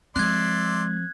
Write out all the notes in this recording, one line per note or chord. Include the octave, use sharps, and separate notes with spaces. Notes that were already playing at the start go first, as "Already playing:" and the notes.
F3 G#3 C4 D5 E5 C6 F#6 G#6